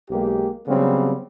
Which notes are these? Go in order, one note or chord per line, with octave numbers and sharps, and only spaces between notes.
B1 G#3 A#3 G4
C#3 F#3 G3 B3 C4